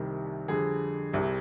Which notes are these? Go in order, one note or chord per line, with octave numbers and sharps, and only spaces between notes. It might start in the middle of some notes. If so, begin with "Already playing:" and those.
Already playing: C2 C3 D#3 G3
F2 D3 G3 G#4
C2 C3 G3